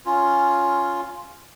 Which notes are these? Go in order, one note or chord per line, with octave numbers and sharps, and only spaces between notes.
C#4 F4